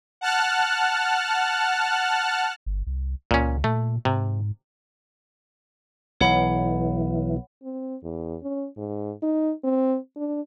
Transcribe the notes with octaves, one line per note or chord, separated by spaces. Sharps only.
F#5 A5 F6 F#6
G1
C2
C#2 A#2 C#4
A#2 A3
G#2 C3
B1 E3 C#5 F#5 B5
C4
E2
C#4
G#2
D#4
C4
D4